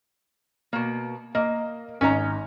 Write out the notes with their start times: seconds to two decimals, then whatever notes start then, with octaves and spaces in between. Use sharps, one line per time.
0.73 B2 A#3
1.35 A#3 D#5
2.01 G#1 C#4 D#5 A#5